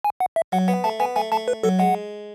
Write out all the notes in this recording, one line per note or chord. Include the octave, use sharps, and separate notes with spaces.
G#5
F#5
E5
F#3 F#5
B3 F#5
A3 A5
B3 G#5
A3 G#5
A3 A5
B4
F#3 A4
G#3 F#5